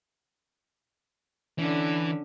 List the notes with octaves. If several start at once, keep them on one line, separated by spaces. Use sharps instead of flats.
D3 E3 C#4